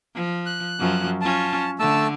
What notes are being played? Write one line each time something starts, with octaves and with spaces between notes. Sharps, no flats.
F3
F#6
F#2 F3
C#4 F4 A5
D3 A3 A5 E6